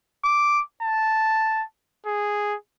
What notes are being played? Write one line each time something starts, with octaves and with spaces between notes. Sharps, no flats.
D6
A5
G#4